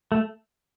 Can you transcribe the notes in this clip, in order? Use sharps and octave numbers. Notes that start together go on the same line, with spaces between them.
A3